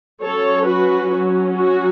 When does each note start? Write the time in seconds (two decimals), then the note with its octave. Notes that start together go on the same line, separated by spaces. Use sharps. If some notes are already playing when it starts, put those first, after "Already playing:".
0.23 F#3 C#4 A4 C#5
0.68 F#4 B4
1.13 F#4
1.56 F#4